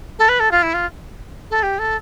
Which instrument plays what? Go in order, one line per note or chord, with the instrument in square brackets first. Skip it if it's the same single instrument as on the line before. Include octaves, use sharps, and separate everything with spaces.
[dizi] A4
B4
A4
F4
E4
F4
A4
G4
A4